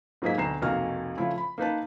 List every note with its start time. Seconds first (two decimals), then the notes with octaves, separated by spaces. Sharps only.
0.22 G#2 F#3 A#3 G#4 D#5 B6
0.38 D2 B2 A#5 C7 E7
0.62 F1 B1 A#3 F#4 F5 F6
1.17 C#3 F3 A3 E4 F4
1.38 B5
1.58 A#3 D#4 B4 A5